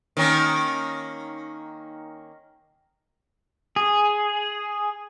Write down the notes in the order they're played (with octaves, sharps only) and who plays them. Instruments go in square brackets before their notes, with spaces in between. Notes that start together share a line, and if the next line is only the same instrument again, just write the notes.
[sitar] D#3 A#3 C#4
[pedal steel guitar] G#4